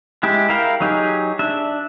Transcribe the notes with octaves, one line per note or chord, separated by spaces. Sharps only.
G#3 E4 G4
E4 A#4 F5 G5
F#3 D#4 G4 G#4
D4 E5